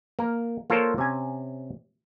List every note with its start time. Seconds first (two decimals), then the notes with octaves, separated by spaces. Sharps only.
0.19 A#3 A#4
0.70 A#3 F4 A4 A#4 C5 C#5
0.98 C3 C#4 G#5